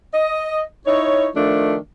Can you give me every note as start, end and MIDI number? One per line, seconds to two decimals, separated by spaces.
0.13 0.61 75
0.85 1.26 63
0.85 1.26 64
0.85 1.26 73
1.35 1.76 51
1.35 1.76 53
1.35 1.76 57
1.35 1.76 62